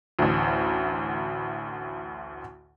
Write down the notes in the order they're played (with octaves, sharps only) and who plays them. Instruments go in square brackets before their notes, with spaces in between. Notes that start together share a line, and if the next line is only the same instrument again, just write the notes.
[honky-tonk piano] A1 D2